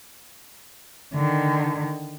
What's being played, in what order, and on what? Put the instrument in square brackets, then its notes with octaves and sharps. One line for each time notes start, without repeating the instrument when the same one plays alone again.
[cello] D3 D#3